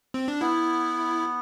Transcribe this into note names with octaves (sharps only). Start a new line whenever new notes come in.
C4
D4
B3 E4